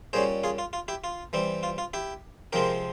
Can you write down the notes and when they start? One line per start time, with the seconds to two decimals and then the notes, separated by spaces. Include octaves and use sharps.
0.13 A#2 G3 C#4 G#4 C5
0.44 F4 G#4
0.58 F4
0.73 F4
0.88 E4 G4
1.04 F4
1.33 E3 G3 C4
1.63 F4
1.78 F4
1.94 E4 G4
2.53 C3 F3 G#3 C4 G4 A#4